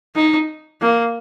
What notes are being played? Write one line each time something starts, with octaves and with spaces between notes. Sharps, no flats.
D#4
A#3